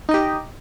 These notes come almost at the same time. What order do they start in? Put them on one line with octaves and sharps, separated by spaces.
D#4 D#5 G4